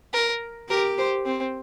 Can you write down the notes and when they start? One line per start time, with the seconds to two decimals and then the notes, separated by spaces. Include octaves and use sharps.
0.14 A#4
0.70 G4 A#4
0.99 C5
1.26 C4